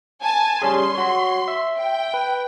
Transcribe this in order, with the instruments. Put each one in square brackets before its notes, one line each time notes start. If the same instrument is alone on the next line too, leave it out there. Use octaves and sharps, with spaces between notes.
[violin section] G#5 A5
[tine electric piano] G3 C#4 G#4 [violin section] C6
[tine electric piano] F#4 C#5
E5
[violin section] G5
[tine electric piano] B4